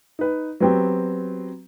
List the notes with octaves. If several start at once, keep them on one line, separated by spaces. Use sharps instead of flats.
D#4 B4
F#3 B3 C4 G4